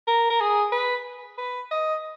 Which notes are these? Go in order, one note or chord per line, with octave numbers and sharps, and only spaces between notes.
A#4
A#4
G#4
B4
B4
D#5